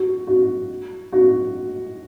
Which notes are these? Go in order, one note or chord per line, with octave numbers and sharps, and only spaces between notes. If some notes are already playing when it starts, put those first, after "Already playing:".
Already playing: F#4
F#4
F#4